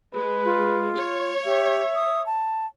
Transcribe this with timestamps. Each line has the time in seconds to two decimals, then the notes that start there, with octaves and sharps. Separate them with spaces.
0.14 G#3 B4
0.45 F4
0.98 C#5
1.45 G4 E5
1.95 D#6
2.26 A5